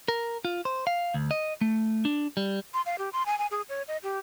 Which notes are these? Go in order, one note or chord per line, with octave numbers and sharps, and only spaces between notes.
A#4
F4
C5
F5
D2
D#5
A3
D4
G3
C6
F5
G4
C6
G#5
G#5
G#4
C#5
D#5
G4